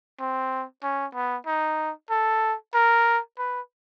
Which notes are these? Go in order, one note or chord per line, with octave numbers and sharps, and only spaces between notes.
C4
C#4
B3
D#4
A4
A#4
B4